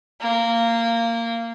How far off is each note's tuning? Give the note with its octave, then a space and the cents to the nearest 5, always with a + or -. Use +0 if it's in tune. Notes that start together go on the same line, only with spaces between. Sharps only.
A#3 -15